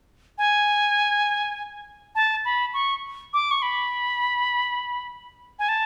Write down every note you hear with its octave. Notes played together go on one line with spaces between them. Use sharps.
G#5
A5
B5
C#6
D6
C#6
B5
G#5
A5